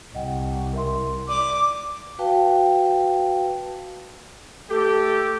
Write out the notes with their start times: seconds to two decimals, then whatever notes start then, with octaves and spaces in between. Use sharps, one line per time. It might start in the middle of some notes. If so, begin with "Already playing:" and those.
0.15 C2 D#5 F#5 G5
0.73 A#4 E5 C6
1.28 D5 D6 D#7 F#7
2.19 F#4 B4 F5 G5 A5
4.70 A3 G4 A4